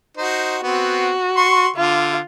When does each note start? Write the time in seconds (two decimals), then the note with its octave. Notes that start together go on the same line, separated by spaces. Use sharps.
0.17 D#4 F#4 C5
0.63 B3 C4 F#4
1.36 C6 C#6
1.76 D3 F4